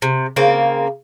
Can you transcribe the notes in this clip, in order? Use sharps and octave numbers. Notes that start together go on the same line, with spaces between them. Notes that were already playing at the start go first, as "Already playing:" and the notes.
C3
C#3 A#3 C4